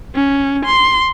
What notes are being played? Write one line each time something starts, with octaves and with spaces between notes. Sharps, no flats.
C#4
C6